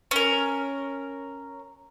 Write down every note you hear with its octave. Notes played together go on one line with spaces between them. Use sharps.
C#4 A#4